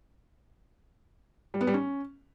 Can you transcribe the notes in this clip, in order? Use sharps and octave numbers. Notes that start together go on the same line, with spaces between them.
G3
B3
G3
C#4